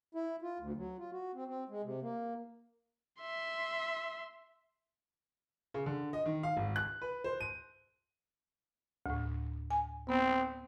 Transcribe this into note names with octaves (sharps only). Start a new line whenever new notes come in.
E4
F4
D2
F#3
F4
F#4
C4
C4
G#3
C3
A#3
E5 C6
C#3
D3
D#5
D#3
F5
G#1
F#6
B4
C5
D#7
D2 A2
G#5
B3 C4